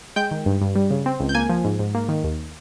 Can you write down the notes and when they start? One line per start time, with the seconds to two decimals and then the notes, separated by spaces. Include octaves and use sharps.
0.16 G#3 G5 G6
0.31 D#3
0.46 G2
0.61 G2
0.76 G3
0.90 C#3
1.06 C4
1.20 C#2
1.29 G6
1.34 A#3 G#5 G#6
1.49 F3
1.64 G#2
1.79 G#2
1.95 A#3
2.09 D#3
2.24 D#2